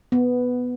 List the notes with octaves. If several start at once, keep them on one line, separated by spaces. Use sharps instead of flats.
B3